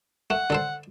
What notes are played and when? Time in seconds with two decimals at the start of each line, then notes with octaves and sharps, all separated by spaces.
0.30 A3 F#5
0.50 D3 A4 C5